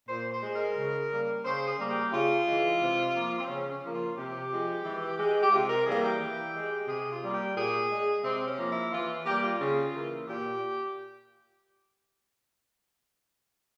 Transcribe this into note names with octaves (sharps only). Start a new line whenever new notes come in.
A#2 C5
C5
G#3
A#4
C#3
G3 A#3
C#3 C5
G#4
G3 A#3
G4
C#3 F4
E3 G#3
C3
F3 A#3
C4
C#3 C#4
C#4
F3
A#3
F4
C3 G4
F3 G#3
E3
G#3
G4
C3 F4
A#4
E3 G3 A#3 G#4
G4
E3
G#3
C3 G#4
F4
G3 A#3
G4
A#2 G#4
G#3
C3 C4
C#4
F3 A#3
E4
E3 F4
G3 A#3 G4
F4
C#3
E3 A#3
A#2 G4